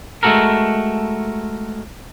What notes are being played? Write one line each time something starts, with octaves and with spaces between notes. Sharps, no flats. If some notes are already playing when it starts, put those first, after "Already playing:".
G#3 A3 B3 F#4 A4 A#4